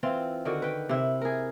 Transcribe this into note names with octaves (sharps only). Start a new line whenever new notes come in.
E3 C4 F4
D3 D#3 F#4
B4 G5
C3 E4
G#4 A#4